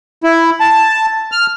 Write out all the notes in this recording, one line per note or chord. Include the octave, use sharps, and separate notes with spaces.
E4
A5
F6